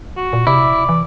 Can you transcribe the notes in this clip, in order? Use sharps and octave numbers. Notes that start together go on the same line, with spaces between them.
F#4
A#2
C3 E4 D5
E3